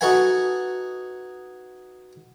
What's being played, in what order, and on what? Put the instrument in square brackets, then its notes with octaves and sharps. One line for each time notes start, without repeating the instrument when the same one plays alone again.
[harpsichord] D#4 F#4 A4 B4 F#5 G#5